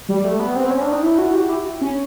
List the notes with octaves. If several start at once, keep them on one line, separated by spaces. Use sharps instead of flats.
G3
A3
B3
C4
C#4
D4
D#4
E4
F#4
G4
E4
C#4